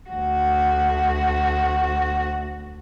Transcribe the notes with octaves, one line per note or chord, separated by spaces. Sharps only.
D2 F#4